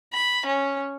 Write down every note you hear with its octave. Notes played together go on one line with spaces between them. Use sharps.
B5
C#4